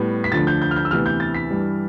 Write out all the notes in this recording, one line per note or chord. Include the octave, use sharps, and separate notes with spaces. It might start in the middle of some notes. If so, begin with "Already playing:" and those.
Already playing: A2 G3 B3
B6
D2 D3 F3 A6
G6
G6
F6
G6
E6
D2 C3 E3 B3 F6
G6
A6
B6
G2 E3 G3